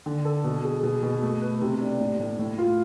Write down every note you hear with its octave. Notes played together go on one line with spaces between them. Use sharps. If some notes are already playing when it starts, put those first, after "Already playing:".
D3
A4
B2
G#4
B2
B2
A3
B4
C3
D4
A2
A2
A2
F4